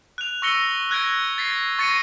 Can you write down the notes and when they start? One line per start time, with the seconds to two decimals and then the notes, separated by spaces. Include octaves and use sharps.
0.18 F#6 F7
0.42 C#6 E6 A#6 C#7 G7
0.91 F#6 G#6 A#6 D7
1.38 A6 B6 C7
1.79 C#6 A6 A#6 C#7 D#7